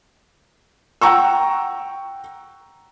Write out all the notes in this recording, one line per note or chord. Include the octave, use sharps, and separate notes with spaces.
F#5 G5 A#5 C#6 E6